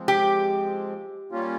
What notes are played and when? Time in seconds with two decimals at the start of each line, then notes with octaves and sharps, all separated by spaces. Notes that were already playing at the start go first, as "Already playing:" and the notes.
Already playing: F3 G#3 C4
0.08 G4
1.31 G3 A#3 C#4 F4